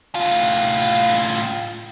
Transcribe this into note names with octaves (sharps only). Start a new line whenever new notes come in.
A2 F4